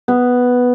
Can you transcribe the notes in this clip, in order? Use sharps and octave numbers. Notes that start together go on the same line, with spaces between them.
B3